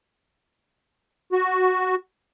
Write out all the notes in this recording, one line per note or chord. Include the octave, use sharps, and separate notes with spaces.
F#4